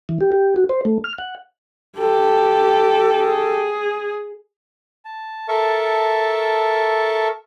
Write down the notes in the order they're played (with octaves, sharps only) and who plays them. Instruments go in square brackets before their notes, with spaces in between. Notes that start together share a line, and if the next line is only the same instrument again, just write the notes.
[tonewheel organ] E3
G4
G4
F#4
C5
A3
F6
F#5
[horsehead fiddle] G4 A4
[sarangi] G#4
[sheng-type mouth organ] A5
A4 A#4 E5 A5 C#6